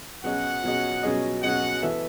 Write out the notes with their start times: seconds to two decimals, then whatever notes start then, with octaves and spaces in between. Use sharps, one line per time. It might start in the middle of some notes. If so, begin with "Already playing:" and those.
0.24 B2 F#3 C#4 G#4 D#5 F#5
0.64 B2 F#3 C#4 G#4 D#5
1.03 B2 F#3 C#4 G#4 D#5
1.43 B2 F#3 C#4 G#4 D#5 F#5
1.82 E3 B3 E4 A4 E5